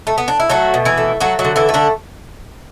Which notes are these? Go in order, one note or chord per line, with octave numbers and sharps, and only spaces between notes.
A3
B3
D4
E4
F#3 A3 F#4
B2
E3 E4
A3
F#3 A3 F#4
F#3 F#4
D3
E3 E4
A3
D3 D4